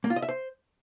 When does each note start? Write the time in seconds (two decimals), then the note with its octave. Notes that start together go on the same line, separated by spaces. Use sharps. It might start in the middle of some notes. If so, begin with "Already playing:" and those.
0.04 A#3
0.10 F4
0.16 D#5
0.22 E5
0.29 C5